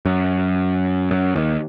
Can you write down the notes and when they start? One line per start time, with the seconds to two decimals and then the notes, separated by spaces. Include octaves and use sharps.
0.05 F#2
1.11 F#2
1.36 D#2